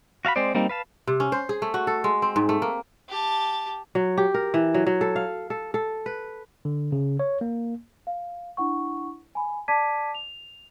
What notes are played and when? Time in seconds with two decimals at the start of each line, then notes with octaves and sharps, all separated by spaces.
0.25 F#4 F5 A5 B5
0.36 G#3 C4 C5 D5
0.55 G3 A#3 C4 D#4
0.69 B4 F5 A5
1.07 C3
1.20 C#4
1.32 C5
1.49 G#4
1.62 A3
1.74 F#4
1.87 A4
2.04 G#3
2.22 C4
2.36 G#2
2.49 A3
2.62 A#3
3.09 G4 A5
3.95 F#3
4.17 G4
4.34 A#4
4.54 E3
4.74 F#3
4.87 F#3
5.01 A4
5.16 F5
5.50 A4
5.74 A4
6.06 B4
6.65 D3
6.92 C#3
7.20 C#5
7.41 A#3
8.07 F5
8.57 D4 E4 F#5 C#6
9.35 G#5 B5
9.68 D5 A5 D6 G#6 B6 D#7
10.15 F7